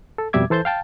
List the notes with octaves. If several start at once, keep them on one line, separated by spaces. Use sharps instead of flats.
A4
F2 B2 G3 E5 D6 G#6
E3 A4 C5 A5 G6
F5 G5 A5